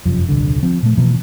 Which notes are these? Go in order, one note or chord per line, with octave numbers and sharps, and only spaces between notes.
F1 F#2 F3
D#1 C2 D3
F3 C4
A#2 A3
B2 E3 F3 A#3